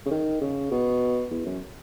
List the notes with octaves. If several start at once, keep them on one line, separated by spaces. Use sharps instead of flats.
C#3
D#3
C#3
B2
E2
F#2